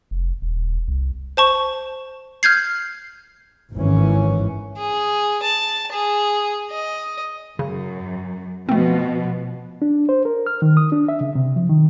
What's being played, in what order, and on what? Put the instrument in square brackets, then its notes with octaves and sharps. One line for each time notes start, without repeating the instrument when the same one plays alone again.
[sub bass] F1
D#1
C2
[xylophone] C5 A5 C#6
F6 G6 G#6 C7
[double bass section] G#1 G#2 E3 C#4
[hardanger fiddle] G#4
A5
G#4
D#5
[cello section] F#2 [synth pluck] C#3
[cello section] B2 F3 [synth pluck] A3 C4
[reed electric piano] D4
C5
A#4
F6
D#3
D#6
D4
E5
C#3
C3
F3
D#3